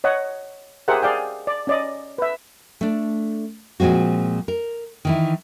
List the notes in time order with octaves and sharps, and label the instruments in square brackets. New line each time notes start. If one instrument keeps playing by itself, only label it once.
[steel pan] C#5 D#5 F#5
G4 G#4 A#4 C5 E5 F#5
G#4 D5 F5 G5
D5
C#4 D5 D#5
B4 E5
[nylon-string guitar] A3 D4
A#2 F3 G#3 C4 F#4
A#4
D#3 E3 E4